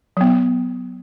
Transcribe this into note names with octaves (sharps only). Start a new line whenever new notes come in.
F#3 B3